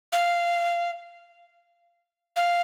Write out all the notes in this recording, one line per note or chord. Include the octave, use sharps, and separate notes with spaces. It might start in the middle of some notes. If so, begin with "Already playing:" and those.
F5
F5